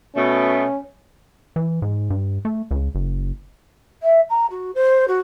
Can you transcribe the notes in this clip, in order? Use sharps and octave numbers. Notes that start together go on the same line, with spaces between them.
B2 A3 C#4
E3
G#2
G2
A3
C#2
F#1
E5
A#5
F#4
C5
F#4